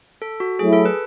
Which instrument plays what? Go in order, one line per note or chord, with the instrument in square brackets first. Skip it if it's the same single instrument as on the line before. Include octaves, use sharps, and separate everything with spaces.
[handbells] A4
F#4
[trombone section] F#3 A3 E4 [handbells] G#4
[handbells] A4
B4